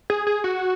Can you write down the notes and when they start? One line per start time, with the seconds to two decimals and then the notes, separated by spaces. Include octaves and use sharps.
0.10 G#4
0.27 G#4
0.44 F#4